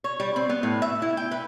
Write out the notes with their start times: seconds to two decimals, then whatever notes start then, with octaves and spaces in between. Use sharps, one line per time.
0.04 C#5
0.20 G3
0.36 C4
0.49 B3
0.63 A2
0.82 E5
1.02 E4
1.17 G5
1.31 B4